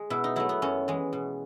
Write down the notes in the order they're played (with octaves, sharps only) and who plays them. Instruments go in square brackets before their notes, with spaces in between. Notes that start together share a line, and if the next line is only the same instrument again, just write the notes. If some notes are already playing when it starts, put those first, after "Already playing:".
Already playing: [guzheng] G#3
B2 E4
D#4
F#3 A3 E4
B3
F#2 C#4
E3 G#3
B2